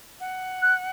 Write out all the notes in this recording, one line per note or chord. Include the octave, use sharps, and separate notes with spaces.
F#5
F#6